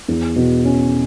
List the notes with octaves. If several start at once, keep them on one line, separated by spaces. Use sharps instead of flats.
E2
B2
C#4